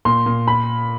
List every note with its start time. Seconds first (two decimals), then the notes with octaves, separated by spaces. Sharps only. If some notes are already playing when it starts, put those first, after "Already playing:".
0.05 A#2 C6
0.26 A#2
0.48 B5